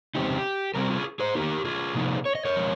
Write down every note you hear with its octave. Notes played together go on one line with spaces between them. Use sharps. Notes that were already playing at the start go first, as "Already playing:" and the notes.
F2 C#3 G#3 C4 D#4 G4
C3 G3 C4 G4 A#4
F4 G#4
G#4 C5
D#3 A#3 D#4 G4 A#4
F4 G#4
C3 F3 A#3 D#4
C#5
D#5
A#4 C#5
F3 G#3